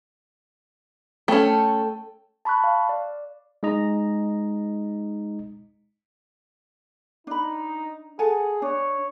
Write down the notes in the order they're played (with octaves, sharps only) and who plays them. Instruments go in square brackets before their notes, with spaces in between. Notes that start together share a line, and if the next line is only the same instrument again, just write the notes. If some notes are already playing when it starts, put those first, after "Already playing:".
[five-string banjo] A3 C#4 [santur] A4 G5
[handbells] A5 B5 C#6 F#6
F5
D5
[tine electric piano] G#3 D#4 D#5 A#5
[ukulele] D4 B5 [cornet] D#4
[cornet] G#4 [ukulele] A4 F#5 G#5
[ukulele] D4 [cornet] C#5